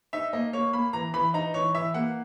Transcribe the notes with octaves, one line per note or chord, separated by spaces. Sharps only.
D#4 E5
A#3 D#5
A#3 C#5
A#3 B5
E3 A#5
E3 B5
D#4 A#5
E3 C#5
E3 E5
A#3 F#5